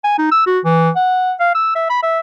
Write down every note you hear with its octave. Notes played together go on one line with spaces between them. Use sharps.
G#5
D#4
E6
F#4
E3
F#5
F5
E6
E5
B5
E5